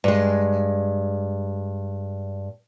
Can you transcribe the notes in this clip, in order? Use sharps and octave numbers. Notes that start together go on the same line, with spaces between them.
G2 G#3